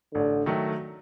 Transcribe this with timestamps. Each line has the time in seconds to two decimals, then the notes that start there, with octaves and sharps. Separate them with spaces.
0.14 A1 D3
0.46 D#3 F#3 A3